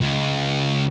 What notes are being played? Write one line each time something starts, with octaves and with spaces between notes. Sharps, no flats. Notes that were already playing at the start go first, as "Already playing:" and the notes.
C#2